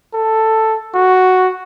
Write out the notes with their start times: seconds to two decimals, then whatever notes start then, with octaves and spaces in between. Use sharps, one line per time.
0.14 A4
0.94 F#4